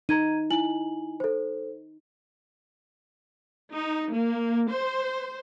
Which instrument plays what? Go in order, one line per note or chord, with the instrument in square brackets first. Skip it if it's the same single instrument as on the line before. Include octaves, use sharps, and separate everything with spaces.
[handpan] D#4 [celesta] A#5 G#6 D#7
[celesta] E4 G#5 F#7
A4 C5
[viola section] D#4
A#3
C5